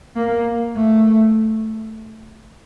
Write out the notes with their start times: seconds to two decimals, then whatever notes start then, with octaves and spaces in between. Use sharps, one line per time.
0.16 A#3
0.76 A3